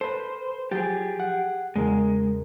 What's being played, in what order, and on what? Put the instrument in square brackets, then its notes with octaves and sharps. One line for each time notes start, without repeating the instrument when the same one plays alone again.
[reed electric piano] A4 B4 [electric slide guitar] C5
[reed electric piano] F3 F#3 A6 [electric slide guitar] G4 G#4
[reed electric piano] F#5
[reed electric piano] E2 C#3 A#4 [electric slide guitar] G#3